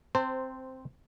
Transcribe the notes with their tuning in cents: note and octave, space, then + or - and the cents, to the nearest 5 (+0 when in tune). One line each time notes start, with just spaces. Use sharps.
C4 +0 C5 -10 A5 +40